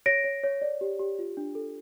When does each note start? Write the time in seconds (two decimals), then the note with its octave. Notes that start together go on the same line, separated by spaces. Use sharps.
0.06 C#5 A#6 D7
0.24 C#5
0.43 C#5
0.62 D5
0.81 G4
0.99 G4
1.19 F4
1.37 D4
1.55 A4